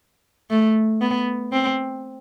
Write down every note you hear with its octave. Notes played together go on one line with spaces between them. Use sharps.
A3
B3
C4